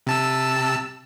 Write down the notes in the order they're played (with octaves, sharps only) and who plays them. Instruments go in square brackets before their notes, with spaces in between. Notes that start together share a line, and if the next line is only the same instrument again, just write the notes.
[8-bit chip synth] C3 A5 E6